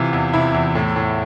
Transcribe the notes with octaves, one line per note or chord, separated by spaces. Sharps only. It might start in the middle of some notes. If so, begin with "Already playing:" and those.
Already playing: C3 E3 F4
E2
C3 E4
E2
A2
A2